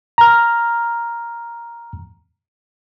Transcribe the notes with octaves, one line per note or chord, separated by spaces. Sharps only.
A#5 F6